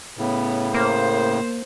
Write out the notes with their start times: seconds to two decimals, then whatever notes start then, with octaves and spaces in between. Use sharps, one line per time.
0.18 A2 C#3 B3
0.74 A#3 C5